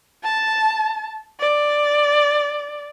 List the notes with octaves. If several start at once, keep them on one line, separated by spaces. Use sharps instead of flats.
A5
D5